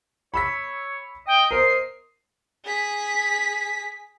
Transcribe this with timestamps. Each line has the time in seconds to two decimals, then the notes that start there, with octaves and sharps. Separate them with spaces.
0.34 C#5 B5 E6 B6
1.27 D#5 G5
1.51 A#4 C5 D#5 C7
2.65 G#4 B6